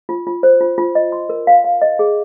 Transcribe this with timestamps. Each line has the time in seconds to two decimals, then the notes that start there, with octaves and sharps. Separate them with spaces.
0.09 F4
0.27 F4
0.43 C5
0.61 F4
0.78 F4
0.95 D#5
1.12 C6
1.29 A#4
1.47 F5
1.64 F5
1.82 D#5
1.99 G#4